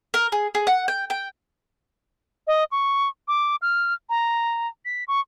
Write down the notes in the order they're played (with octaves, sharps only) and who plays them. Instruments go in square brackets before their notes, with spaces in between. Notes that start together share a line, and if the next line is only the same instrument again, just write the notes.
[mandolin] A#4
G#4
G#4
F#5
G5
G5
[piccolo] D#5
C#6
D6
F6
A#5
B6
C#6